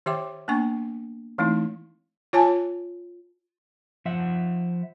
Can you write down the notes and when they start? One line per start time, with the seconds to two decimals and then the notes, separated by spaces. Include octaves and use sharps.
0.06 D#3 G4 C#5 E5 G5 D6
0.48 A#3 B3 D4 G#5 C#6
1.38 E3 A3 C4 D#4 E4
2.33 F4 C#5 G#5 A5
4.05 F3 E5 F#5